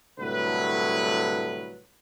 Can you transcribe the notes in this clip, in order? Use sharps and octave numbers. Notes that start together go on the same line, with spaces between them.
C2 A2 D3 F#3 B4